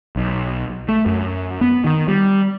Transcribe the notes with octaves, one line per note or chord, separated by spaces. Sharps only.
B1
A3
F#2
B3
D#3
G3